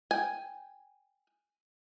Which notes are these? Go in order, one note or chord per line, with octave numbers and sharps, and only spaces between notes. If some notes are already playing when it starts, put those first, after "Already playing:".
G5 G#5